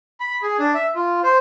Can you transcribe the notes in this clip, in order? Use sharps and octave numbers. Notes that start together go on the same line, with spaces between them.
B5
G#4
D4
E5
F4
C5